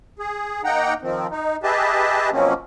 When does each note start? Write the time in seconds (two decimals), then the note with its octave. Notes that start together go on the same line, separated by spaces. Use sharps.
0.19 G#4
0.64 A#3 D#4 F#5 G5 A#5
1.02 D#3 F3 C4
1.31 D#4
1.63 G4 G#4 B4 D#5 E5 A5
2.32 B2 F3 F#3 A#3 C4 C#4